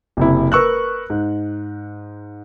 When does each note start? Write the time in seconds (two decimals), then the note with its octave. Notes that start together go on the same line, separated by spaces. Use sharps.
0.17 F#1 C3 E4
0.52 A#4 B4 C#6 E6 F#6
1.10 G#2